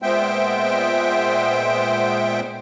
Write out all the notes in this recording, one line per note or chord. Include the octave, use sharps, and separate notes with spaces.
A#2 G#3 B3 C5 E5 G5